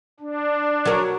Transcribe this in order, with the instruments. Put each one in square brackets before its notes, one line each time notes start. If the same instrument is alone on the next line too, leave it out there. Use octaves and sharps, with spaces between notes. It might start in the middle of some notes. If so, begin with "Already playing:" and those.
[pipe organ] D4
[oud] F#3 A#4